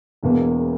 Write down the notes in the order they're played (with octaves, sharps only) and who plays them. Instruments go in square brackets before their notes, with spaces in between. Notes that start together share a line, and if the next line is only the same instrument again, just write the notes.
[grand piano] E1 E2 B2 A#3